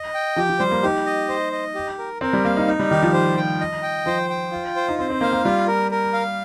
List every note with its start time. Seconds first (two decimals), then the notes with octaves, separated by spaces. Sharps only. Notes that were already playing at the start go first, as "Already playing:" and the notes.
Already playing: D#5
0.14 G5
0.36 F3 G4
0.49 F3
0.59 G3 C5
0.71 A#3
0.83 D#4 G4
1.06 D#5
1.29 C5
1.52 D#5
1.75 G4
1.98 A#4
2.21 C4 A#4
2.33 G3
2.45 A#3 F5
2.57 D#4
2.68 D#4
2.79 G3
2.91 D#3 G4
3.03 F3
3.13 C5
3.37 G5
3.61 D#5
3.83 G5
4.06 F3 C5
4.30 G5
4.52 F4
4.76 C5
4.89 D#4
4.99 C4 C5
5.10 C4
5.21 A#3 F5
5.33 A#3
5.45 G3 F4
5.67 A#4
5.91 A#4
6.13 F5